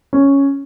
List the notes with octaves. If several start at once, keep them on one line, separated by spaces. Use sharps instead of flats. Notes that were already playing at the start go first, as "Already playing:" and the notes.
C#4